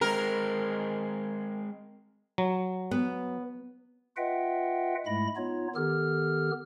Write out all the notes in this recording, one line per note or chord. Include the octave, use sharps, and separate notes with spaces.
G#3 C4 A#4
F#3
B3
F4 B4 D#5 E5 F#5 G5
G#2 G#3 A3 E4 B5 A#6
B3 D#4 F4 C#5
D#3 B3 G4 A4 F6